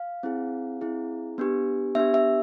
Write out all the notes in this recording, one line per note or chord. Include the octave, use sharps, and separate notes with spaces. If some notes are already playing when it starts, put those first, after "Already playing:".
Already playing: F5
C4 E4 G#4
C4 E4 G#4
B3 D4 G4
B3 D4 G4 E5
E5